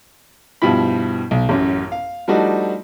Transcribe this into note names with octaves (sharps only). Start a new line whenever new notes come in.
G2 B2 F3 E4 B5
B1
A1 F#2
F5
F3 G3 A3 D4 D#4 F#4